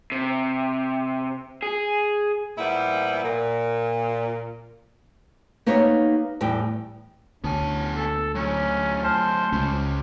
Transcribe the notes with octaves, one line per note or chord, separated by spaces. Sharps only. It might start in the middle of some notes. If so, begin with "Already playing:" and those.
C3
G#4
A#2 F3 G3 B3 E4
A#2
A#3 B3 D#4 G4 C#5
E2 A2 G3 G5
D2 B3 C#4 G#5 A5
A4
F#3 A3 C#4
C5 G#5 A5 F6
C#2 C#4 F4